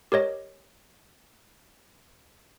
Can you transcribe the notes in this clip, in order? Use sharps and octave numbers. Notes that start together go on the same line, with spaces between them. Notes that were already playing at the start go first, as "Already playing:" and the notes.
G4 A#4 C#5 D#5